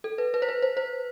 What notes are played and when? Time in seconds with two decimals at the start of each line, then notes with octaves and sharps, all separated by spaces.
0.04 A4
0.18 B4
0.34 B4
0.42 C5
0.49 B4
0.62 C5
0.77 C5